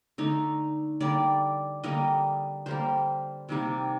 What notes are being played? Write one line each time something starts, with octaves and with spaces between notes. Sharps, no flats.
D3 A3 D#4
D3 G3 A#3 D5
D3 G3 A#3 D#5
D3 G3 A#3 C5
C3 D#3 G3 A#3